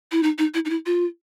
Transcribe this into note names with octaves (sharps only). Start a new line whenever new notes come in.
E4
D#4
D#4
E4
D#4
E4
F4